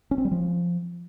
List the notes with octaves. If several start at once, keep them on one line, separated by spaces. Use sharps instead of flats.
C#4
C4
G3
F3